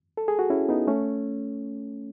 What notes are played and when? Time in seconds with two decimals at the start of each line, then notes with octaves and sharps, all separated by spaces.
0.17 A4
0.28 G#4
0.39 F#4
0.50 C#4 E4
0.69 B3 D#4
0.87 A3 C#4